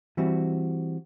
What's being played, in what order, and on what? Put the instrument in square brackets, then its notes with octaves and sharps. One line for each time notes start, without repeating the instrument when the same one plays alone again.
[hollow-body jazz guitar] E3 G3 C4 F#4